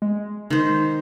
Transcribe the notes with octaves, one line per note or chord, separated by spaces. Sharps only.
G#3
D#3 C5